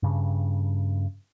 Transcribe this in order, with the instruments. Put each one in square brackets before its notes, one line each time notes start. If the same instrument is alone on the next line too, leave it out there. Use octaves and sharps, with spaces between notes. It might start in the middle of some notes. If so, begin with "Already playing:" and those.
[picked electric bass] G2 C#3